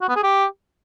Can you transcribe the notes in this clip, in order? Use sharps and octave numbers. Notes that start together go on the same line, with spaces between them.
F#4
B3
G#4
G4